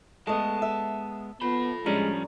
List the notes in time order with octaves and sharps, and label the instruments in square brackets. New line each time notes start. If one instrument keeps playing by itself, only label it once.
[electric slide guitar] G#3 B3 [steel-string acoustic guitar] A3 D#5 [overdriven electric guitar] A5
[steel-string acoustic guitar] E5
[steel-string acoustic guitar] F3 [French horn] B3 [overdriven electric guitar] A4 B5
[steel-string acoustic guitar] A2 D4 A#5 [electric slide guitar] F3 G3 C#4 [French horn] G#3